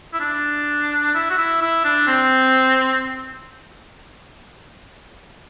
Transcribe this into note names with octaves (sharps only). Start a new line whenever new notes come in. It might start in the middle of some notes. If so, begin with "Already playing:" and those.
E4
D4
E4
F#4
E4
E4
D4
C4